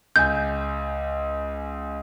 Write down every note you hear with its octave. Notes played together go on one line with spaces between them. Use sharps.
C#2 G#5 G6